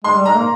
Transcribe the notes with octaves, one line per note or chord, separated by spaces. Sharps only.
G#3 C6
G3
G#3 A#5
A#3